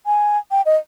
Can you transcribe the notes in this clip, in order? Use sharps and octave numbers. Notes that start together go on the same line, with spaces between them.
G#5
G5
D#5